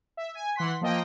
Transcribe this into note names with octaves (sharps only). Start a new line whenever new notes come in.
E5
G#5
E3 F#5 C6 B6
F3 A#3 D#5 G5